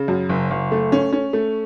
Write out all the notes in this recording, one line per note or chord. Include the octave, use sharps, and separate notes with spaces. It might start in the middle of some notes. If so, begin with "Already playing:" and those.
Already playing: C#3
F#2
F#1
F#1
A3
C#4
C#4
A3